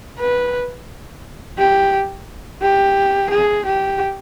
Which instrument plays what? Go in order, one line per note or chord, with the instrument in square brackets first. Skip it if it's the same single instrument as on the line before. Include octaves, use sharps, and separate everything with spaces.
[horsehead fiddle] B4
G4
G4
G#4
G4